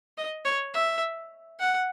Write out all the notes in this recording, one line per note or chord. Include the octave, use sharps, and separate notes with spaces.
D#5
C#5
E5
F#5